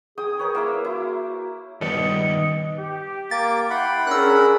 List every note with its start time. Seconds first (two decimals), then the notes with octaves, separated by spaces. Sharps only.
0.18 G#4 G5 D#6
0.39 A#4 B4 C#5
0.55 A#3 E4 E5
0.85 E4 F#4
1.81 G2 D#3 G3 B3 D#5 C#7
2.79 G4
3.31 A#3 D6 A6
3.70 E4 F#5 G5 B5 C6
4.07 C#4 D4 G#4 A#4 E6 F#6